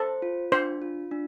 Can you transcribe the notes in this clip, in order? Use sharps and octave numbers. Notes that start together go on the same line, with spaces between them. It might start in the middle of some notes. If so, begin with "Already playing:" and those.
Already playing: A4 C5
F4
D4 C5
F4
D4